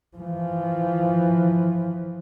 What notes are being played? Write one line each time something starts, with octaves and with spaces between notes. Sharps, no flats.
E3 F3